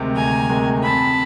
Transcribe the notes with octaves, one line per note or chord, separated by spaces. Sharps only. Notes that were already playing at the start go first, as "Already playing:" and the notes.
Already playing: D2 C3 D#3 G#3
D2 G#5 A#5
C3 D#3 G#3
F2 A5 B5